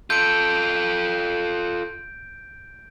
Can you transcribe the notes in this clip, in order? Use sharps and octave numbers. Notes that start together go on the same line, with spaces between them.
F4 A4 G6 D7